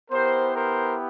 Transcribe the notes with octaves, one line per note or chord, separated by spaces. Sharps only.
B3 E4 G4 A#4 C5
A#4 C5